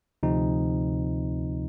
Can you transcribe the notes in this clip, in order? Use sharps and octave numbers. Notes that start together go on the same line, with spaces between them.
D2 C3 F3 C4 D#4